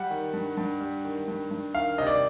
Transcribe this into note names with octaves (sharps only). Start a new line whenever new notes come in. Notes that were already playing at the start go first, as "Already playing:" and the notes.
Already playing: G3 F#5
D#3
G2
G2
G3
D#3
G2
G2
D#3 F5
C3 D#5
D5